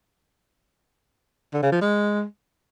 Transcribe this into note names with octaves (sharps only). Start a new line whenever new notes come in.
D3
C#3
F3
G#3